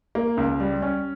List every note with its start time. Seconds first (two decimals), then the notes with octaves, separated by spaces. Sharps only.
0.15 A#3
0.37 C#2
0.60 G3
0.82 C#4